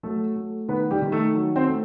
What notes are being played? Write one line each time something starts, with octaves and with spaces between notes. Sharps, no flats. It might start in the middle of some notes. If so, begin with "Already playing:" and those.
F#3 A3 A4
A3
D#3 B3 B4
G3 G4
D#3
A3 A4
F#3
C4 C5
A3